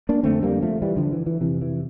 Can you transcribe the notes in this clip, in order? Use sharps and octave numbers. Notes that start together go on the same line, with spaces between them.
A#3 D4
F2 D3 A3 C4
G3 A#3
F3 A3
E3 G3
D3 F3
E3
E3
F2 C3 E3
E3